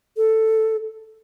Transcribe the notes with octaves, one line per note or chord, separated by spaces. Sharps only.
A4